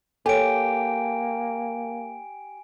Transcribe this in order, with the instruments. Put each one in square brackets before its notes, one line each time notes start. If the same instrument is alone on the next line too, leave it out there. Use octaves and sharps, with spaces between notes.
[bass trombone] A#3 [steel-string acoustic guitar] G4 [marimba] A4 C#5 [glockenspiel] G#5 D7